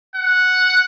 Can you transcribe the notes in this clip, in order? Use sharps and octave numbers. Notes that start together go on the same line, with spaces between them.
F#5